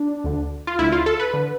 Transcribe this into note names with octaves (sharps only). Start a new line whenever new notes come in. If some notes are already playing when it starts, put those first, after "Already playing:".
Already playing: D4
D2 D3
F4
D2 D3 E4
F4
A4
B4
D3